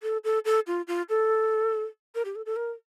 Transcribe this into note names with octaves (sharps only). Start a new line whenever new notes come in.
A4
A4
A4
F4
F4
A4
A#4
G4
A4
A4
A#4